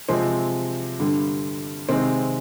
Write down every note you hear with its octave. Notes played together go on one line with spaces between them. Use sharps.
C3 F3 G#3 C4
G2 D3 G3
C3 D#3 G#3 C4